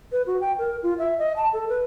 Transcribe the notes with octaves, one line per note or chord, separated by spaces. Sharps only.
B4
F#4
G5
A#4
F4
E5
D#5
A5
A4
B4